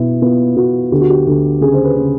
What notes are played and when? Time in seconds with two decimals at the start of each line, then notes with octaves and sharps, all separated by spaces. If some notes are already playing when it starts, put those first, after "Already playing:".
Already playing: B2 B3 E4
0.22 B3 F4
0.56 B3 F#4
0.92 D2 G4
1.01 F#4
1.10 G4
1.26 D2
1.61 C#3 G#4
1.73 C5
1.84 B4
1.96 C#3